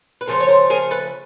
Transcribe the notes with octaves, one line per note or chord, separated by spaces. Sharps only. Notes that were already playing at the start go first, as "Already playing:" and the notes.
B4
C#3 F3 A3 A#4 C5
C#5
A#4 C5
G#4 A#4
A4 B4